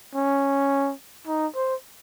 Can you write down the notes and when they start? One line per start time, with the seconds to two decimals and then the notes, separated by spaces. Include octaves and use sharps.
0.15 C#4
1.27 D#4
1.55 C5